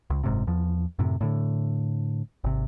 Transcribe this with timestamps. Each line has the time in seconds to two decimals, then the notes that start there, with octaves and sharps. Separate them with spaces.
0.10 C#2
0.24 F#1 G#2 C3
0.47 E2 F3
0.99 F#2 A2 C3
1.21 A2 D3
2.44 G#1 C3